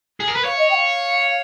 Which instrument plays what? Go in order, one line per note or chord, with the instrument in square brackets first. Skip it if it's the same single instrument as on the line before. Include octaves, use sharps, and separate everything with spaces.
[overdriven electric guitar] G#4
A#4
B4
[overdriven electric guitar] C#5 [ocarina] F5
[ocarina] D#5
G5
F5